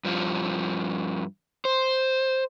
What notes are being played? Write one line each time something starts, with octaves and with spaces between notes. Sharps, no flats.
G2 F3
C5